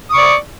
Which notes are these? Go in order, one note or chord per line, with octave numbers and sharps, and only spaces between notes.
D5 C#6 D#6